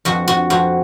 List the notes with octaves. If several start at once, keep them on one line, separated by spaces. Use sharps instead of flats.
F2 F#4
F#4
F2 F#4